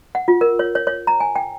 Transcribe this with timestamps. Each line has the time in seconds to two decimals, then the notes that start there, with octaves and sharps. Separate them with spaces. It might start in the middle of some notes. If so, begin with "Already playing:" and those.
0.15 F#5
0.28 F4
0.41 A#4
0.59 C#5
0.75 C#5
0.87 C#5
1.07 A#5
1.20 G#5
1.36 G5